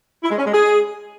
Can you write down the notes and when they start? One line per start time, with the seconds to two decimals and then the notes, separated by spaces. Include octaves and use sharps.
0.23 E4
0.31 G#3
0.38 C#4
0.46 G#3
0.53 G#4